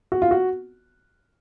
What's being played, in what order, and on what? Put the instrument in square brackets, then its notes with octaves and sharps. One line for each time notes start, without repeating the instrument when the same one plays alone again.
[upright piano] F#4
F4
F#4